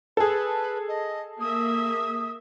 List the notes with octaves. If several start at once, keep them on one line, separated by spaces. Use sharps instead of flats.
G#4 A4 B4
D#5
A#3 E5 D#6